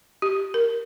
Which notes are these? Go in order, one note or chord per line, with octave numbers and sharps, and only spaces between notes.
G4
A#4